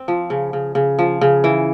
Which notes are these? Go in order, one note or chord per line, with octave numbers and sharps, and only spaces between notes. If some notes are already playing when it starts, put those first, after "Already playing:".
Already playing: C4
F3
C#3
C#3
C#3
F3
C#3
E3